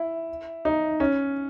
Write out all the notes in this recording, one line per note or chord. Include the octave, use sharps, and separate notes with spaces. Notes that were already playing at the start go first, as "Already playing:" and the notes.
Already playing: E4
D#4
C#4